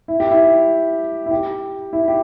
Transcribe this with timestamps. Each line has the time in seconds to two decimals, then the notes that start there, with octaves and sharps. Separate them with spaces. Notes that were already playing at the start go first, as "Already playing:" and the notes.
0.08 E4
0.20 G4
0.31 E4
1.26 E4
1.31 G4
1.93 E4
2.08 G4